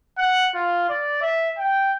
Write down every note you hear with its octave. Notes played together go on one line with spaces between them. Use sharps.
F#5
F4
D5
E5
G5